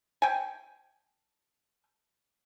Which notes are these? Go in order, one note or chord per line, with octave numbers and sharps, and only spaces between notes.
G5 G#5